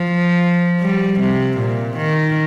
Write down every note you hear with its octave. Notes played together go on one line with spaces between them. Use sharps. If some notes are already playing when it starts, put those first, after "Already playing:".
Already playing: F3
G3
C3
A#2
D#3